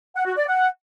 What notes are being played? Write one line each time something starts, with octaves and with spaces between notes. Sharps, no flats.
F#5
F#4
D5
F#5